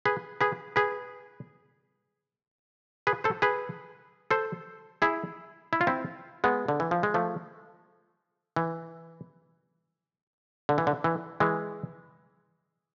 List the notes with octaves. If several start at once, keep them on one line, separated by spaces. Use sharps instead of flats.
G#4 B4
G#4 B4
G#4 B4
G#4 B4
A4 C5
G#4 B4
A4 C5
E4 G#4
E4
F4
C4 E4
G#3 B3
D3
E3
F3
G#3
F3 A3
E3
D3
E3
D3
E3
E3 G#3